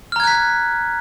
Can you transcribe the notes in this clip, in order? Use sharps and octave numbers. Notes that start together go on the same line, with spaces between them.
A#5 F6 F#6 G#6 B6